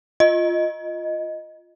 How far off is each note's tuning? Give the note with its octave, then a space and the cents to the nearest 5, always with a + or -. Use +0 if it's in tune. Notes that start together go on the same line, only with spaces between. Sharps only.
F4 +0 D#5 +0